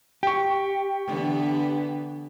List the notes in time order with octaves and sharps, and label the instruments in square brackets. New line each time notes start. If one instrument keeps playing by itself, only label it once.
[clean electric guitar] G4 [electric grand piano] G5 C#6
[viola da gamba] D3 E3 B3